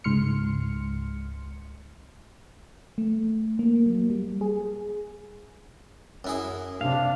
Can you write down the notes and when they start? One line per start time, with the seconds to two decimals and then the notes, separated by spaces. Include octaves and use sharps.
0.04 C#2 G#2 C6 F6 C#7
2.98 A3
3.59 A#3
3.86 F#3
4.10 G3
4.41 G#4
6.24 F#2 E4 G#4
6.81 C3 D4 F5